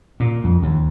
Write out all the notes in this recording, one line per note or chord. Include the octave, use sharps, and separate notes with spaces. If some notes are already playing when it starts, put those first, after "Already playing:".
A#2
F2
D#2